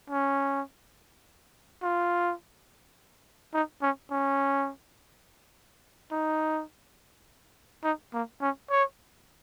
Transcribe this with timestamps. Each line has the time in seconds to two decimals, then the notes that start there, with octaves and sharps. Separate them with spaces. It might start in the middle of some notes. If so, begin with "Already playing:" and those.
0.10 C#4
1.82 F4
3.54 D#4
3.82 C#4
4.11 C#4
6.11 D#4
7.84 D#4
8.13 A#3
8.41 C#4
8.70 C#5